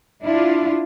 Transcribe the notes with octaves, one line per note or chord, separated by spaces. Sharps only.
D4 E4 F4